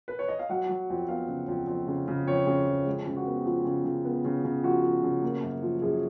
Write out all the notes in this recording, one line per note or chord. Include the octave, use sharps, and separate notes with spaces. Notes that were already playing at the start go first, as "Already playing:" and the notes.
B4
C#5
D#5
F5
F#3 F#5
F#3
F2
B3 F5
C#3
F2
F2
C#3
C#3
F2 C#5
C#3
F2
G#3
C#3
F#4
B3
F3
C#3
C#3
B3
C#3
C#3
F3 F#4
F3
C#3
A#3
F#2
F3
F#2 G#4